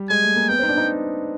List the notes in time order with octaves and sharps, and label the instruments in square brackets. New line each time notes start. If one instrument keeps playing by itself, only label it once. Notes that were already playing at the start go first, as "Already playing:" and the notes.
Already playing: [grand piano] G3
[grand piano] G#3 [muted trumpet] G#5
[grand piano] A3
A#3
[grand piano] B3 [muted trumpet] G5
[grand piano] C4
D#4
D4
D#4